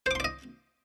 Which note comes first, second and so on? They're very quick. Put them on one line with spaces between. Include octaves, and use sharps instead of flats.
C5 D6 C6 D5 D#5